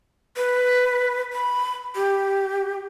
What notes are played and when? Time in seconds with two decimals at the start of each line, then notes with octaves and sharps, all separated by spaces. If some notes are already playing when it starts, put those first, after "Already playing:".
0.37 B4
1.33 B5
1.95 G4